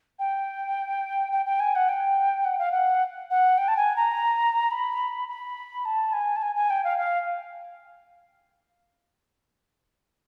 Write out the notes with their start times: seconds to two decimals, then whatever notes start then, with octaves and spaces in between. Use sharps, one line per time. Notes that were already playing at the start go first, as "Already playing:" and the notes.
0.19 G5
1.32 G5
1.46 G5
1.60 G#5
1.75 F#5
1.89 G5
2.45 F#5
2.58 F5
2.71 F#5
3.30 F#5
3.58 G5
3.68 A5
3.77 G#5
3.96 A#5
4.71 B5
5.28 B5
5.85 A5
6.13 G#5
6.36 A5
6.42 G#5
6.55 G#5
6.70 G5
6.84 F5
6.98 F5